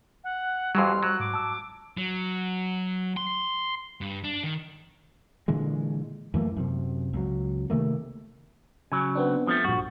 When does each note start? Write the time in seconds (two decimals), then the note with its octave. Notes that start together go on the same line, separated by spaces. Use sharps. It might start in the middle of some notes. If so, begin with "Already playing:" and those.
0.24 F#5
0.75 F2 E3 F#3 G3 C6 F6
1.03 F#3 F#6
1.20 G#2 D6
1.34 A5 E6
1.97 F#3
3.17 C6
4.01 G2
4.24 D4
4.43 D#3
5.48 A#2 D3 E3 G#3
6.34 F#2 E3 A3 A#3
6.57 F#2 C3
7.13 C#2 F#3
7.70 C3 D#3 A3 A#3
8.92 C#3 F#3 G#5
9.15 B3 C4 D4
9.47 F3 G3 A3
9.64 A#1 G2 F#4